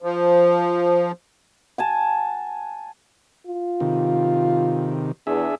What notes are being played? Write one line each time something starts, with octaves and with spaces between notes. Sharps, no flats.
F3
F#5 G#5 A5
F4
C3 D#3
E2 D4 G#4 E5